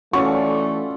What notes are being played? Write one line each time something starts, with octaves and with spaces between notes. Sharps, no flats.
E3 A3 C#4 F4 F#4 A4 D5 C#6